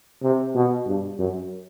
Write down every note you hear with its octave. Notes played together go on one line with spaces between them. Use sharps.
C3
B2
G2
F#2